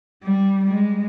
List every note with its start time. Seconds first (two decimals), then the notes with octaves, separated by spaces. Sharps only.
0.24 G3
0.65 G3 G#3